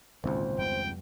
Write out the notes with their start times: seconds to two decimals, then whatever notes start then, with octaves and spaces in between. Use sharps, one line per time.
0.24 G#1 C#2 G2 A#2 D3 C5
0.58 F2 G3 B3 G5